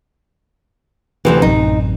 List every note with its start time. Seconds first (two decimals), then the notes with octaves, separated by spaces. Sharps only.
1.25 D2 C3 E3
1.42 A1 F#2 C3 D#4